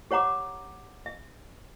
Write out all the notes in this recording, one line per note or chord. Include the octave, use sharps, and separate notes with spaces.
G4 C#5 F#5 A#5 D6
E5